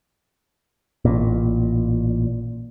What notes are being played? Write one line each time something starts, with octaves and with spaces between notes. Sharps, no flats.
A1 A#2